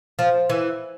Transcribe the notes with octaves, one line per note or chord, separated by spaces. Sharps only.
F3
E3